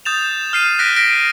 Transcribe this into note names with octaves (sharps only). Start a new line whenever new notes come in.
D#6 G6 A6 E7 F7
F6 C7 D#7
F#6 A#6 B6 D7 D#7
A#6 B6 D7